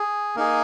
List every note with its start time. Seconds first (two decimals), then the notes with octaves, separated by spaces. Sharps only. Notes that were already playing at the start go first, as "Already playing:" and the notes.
Already playing: G#4
0.36 A#3 D#4 G#4 A#4